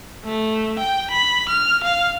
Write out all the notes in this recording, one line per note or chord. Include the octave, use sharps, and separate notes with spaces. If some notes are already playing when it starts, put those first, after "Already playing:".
A3
G5
B5
F6
F5